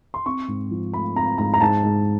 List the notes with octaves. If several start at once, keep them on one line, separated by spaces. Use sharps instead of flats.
C6
C4 C#6
G#2
F3
A3 B5
C4 A#5
G#2 A#5
A#5
G#2 A5
G#2